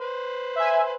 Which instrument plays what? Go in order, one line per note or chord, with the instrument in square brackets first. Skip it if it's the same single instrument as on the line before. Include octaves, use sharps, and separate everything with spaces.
[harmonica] B4 C5
[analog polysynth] E5 G#5